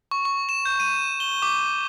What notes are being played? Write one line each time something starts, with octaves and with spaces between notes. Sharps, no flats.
C#6
C#6
E7
G6
D#7
G7
D6